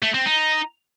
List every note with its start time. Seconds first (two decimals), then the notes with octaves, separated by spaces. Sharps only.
0.03 A3
0.14 C4
0.26 D#4